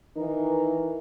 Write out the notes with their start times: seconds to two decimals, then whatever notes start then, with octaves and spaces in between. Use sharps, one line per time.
0.17 D#3 E3 D#4 A#4